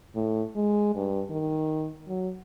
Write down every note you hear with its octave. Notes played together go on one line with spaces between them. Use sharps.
A2
G#3
G2
D#3
F#3